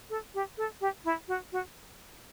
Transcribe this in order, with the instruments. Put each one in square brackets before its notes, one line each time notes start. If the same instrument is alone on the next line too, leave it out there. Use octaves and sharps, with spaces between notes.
[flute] A4
G4
A4
G4
E4
F#4
F#4